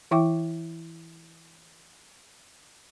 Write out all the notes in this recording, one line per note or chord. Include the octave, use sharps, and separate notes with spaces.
E3 E4 E5 G5 D6